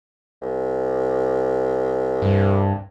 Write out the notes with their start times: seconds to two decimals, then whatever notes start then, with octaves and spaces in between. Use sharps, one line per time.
0.41 C2
2.22 G2